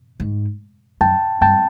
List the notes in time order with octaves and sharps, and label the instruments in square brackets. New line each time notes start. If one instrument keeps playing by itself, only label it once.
[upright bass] G#2
[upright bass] F#2 [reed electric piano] G5 A5
[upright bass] G2 [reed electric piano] G5 A5